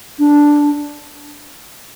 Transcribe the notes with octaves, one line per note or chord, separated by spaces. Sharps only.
D4